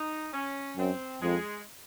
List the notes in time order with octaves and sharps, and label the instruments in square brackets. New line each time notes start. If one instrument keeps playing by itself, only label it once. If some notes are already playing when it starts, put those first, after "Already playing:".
Already playing: [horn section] D#4
C#4
[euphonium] F#2 [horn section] C4
[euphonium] F2 [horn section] G#3